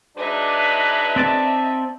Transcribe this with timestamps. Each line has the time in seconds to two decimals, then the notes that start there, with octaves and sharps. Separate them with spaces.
0.17 F#3 G#3 D4 D#4 B4 E5
1.16 C4 D5 A5